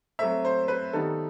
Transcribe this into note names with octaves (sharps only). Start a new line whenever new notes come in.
F#3 A3 C4 E5
C5
B4
D#3 G3 B3 D#4 A4